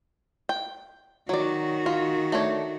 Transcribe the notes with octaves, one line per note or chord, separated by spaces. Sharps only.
G5
D#3 F#3 F#4 D5
F4
A3 D4 C#5